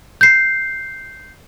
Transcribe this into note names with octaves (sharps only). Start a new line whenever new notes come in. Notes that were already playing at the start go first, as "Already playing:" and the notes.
G6 C7